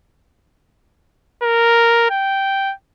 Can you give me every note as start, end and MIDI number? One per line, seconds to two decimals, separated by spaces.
1.43 2.08 70
2.11 2.73 79